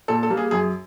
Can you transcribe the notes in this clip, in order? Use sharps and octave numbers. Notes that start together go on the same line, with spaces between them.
A#2 A4
A4
G3 A#3
G#4
F#2 G#4